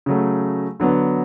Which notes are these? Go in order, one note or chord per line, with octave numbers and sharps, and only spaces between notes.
C#3 F#3 A3
D3 F#3 B3